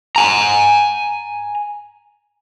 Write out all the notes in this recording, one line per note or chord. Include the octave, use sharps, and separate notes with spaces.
G#5 A#5